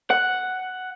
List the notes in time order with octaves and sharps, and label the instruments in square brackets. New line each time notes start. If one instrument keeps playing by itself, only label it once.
[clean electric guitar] F#5